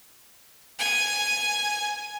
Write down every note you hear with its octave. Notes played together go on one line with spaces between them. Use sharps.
G#5